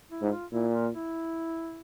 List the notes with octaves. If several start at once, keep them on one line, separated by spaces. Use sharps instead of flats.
E4
G#2
E4
F4
A#2 E4
F4
E4